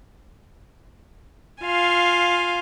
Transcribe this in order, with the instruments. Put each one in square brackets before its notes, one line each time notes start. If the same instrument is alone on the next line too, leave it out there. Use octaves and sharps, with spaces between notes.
[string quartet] F4 F5 G#5